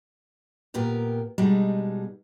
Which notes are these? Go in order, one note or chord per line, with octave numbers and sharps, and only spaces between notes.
A#2 B3 G4 A#4
B2 G3 G#3 D4 D#4